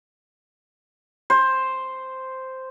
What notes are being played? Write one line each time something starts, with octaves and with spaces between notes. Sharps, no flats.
C5